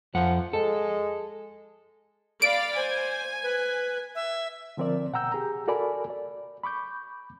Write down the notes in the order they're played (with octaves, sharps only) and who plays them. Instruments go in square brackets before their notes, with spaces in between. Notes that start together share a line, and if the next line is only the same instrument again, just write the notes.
[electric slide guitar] F2 F#5 [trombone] F3
[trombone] G#3 [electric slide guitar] A4
[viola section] D5 F5 B5 [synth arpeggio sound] D7
[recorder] C5 [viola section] G#5
[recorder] B4
E5
[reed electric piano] D3 F3 C4 A#4 D5
B2 F#5 G5 A#5 E6 G6
G4 G#4 A#5
F#4 A4 A#4 D5 G#5 B5
D5
B5 C#6 D6 G6